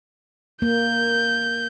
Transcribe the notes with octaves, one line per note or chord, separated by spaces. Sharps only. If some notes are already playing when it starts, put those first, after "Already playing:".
A#3 G6